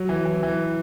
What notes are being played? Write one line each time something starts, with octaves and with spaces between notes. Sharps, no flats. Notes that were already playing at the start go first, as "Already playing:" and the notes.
Already playing: F#3
E3
E3
E3